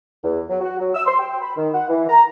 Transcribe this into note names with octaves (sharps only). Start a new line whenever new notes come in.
E2
F#3
F#4
F#3
E6
C6
G5
B5
D#3
F#5
E3
A#5